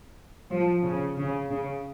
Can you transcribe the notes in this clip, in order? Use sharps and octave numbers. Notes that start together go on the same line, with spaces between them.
F3
C#3
C#3
C#3